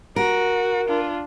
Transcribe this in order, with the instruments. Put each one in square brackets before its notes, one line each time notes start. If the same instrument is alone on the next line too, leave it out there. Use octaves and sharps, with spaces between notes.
[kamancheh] F#4 [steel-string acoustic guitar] A#4
[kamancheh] D4 F4